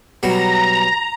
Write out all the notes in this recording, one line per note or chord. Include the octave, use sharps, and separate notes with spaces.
B2 F#3 G3 A#5